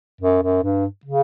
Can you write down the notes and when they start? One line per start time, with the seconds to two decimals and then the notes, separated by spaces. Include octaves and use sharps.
0.21 F#2
0.42 F#2
0.63 G2
1.05 C#3